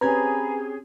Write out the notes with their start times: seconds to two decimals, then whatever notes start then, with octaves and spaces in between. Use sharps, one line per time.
0.01 C4 C#4 G4 G#4 B4 A#5 B5 G#6